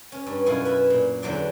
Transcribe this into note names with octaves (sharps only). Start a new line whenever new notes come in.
C#4
G2
F#2 B2 E4 F4 G#5
B4 E5
A#2
E2 D3 F#3 C5 D5 E5